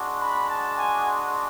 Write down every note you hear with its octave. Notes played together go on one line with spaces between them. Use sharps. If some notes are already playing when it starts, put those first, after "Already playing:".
Already playing: G#3 D4 F#4
B5
A5
G#5